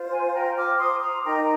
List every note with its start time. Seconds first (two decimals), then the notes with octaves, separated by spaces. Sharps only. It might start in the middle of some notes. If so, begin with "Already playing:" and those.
Already playing: F4 C5
0.10 G#5 C6
0.34 G5 A#5
0.56 D6 F6
0.79 C6 D#6
1.02 A#5 D6
1.25 D#4 A#4 G5 A#5